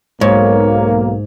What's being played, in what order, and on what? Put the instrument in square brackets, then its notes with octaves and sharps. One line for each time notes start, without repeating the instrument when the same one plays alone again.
[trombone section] B1 A#3 [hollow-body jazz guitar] G#2 [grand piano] C#5